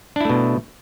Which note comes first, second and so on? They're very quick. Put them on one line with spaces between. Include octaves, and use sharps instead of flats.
D4 E4 A3 B2